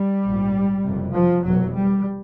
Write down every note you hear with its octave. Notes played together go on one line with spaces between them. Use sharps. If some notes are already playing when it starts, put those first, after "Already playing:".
Already playing: G3
A#1 G#2
F#1 F2 C3
F3
F1 E2 B2 F#3
G3